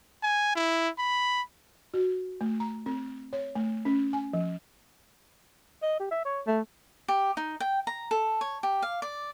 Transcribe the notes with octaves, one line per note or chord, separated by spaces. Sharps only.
G#5
E4
B5
F#4
A3
A#5
C4
C#5
A3
C#4
G#5
F3
D#5
G4
E5
C#5
A3
G4
D#4
G5
A#5
A4
C#5
G4
F5
D5